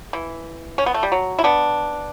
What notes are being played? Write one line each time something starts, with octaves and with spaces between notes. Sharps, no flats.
E3
C#4
B3
A3
G3
F#3
E4
B3 D4